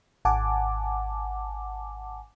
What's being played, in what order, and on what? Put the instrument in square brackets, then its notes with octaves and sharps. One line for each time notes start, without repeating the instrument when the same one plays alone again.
[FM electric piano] G#1 F#5 G#5 A5 D6